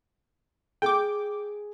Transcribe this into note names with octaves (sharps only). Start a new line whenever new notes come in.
G#4 G5 D6